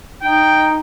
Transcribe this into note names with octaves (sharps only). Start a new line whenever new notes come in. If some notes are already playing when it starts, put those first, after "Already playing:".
D#4 G5